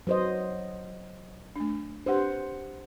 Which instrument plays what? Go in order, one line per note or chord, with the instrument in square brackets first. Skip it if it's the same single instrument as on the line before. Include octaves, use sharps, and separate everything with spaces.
[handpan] F#3 C5 D#5 [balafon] B4
[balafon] A3 D4
[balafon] D4 G4 B4 [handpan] C5 F#5